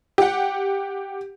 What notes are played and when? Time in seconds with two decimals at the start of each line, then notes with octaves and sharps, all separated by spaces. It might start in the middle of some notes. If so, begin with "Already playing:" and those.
0.18 G4 F#5